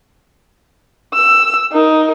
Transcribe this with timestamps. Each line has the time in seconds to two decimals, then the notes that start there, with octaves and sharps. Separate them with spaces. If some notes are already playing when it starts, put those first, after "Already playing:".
1.14 E6
1.72 D#4 A#4